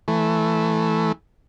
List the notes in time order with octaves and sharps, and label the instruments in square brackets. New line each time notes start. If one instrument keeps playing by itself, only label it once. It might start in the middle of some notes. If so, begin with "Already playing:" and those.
[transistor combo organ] E3 A3